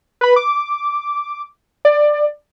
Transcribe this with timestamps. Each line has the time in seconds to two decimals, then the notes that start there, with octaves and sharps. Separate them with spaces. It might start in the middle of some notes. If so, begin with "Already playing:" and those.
0.21 B4 B5
0.36 D6
1.85 D5